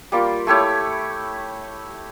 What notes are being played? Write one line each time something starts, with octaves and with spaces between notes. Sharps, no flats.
G3 A#3 F4
A3 E4 G4 C#5